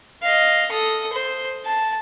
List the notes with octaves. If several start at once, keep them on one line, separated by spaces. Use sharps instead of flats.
D#5 F5
A4 D#6
C5
A5